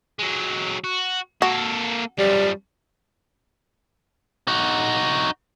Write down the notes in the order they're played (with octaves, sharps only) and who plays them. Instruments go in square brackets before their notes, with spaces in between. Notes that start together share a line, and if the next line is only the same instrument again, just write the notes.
[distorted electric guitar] F#3 G#3
F#4
[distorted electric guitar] A#3 A4 [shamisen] F#4
[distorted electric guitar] F#2 F3 [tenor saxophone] G3
[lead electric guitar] D#4 F#4